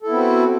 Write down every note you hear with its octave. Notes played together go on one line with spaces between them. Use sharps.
B3 C4 E4 F#4 A4